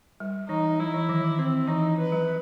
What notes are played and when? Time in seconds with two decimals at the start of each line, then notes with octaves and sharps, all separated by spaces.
0.20 G3
0.49 E3 D#4
0.79 F#3 E4
0.94 E3
1.09 D#3
1.38 C4
1.68 E3 D#4
1.98 B4
2.12 F#3